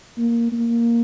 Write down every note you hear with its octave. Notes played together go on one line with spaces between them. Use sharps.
A#3
A#3